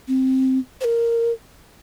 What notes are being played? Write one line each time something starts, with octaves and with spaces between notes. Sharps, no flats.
C4
C5
A#4